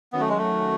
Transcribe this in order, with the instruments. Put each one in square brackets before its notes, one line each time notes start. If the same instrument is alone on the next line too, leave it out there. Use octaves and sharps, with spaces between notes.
[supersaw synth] D#3 F#3 C#4 F#4 [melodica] B3
[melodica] A3
G#3
A3